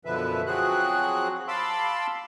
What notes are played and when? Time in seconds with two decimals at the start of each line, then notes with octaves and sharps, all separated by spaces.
0.05 F#2 B2 D3 F3 B4 E5
0.46 F3 F#3 C4 F#4 G#4 F#6
1.48 F5 A5 B5 C6 D6 E6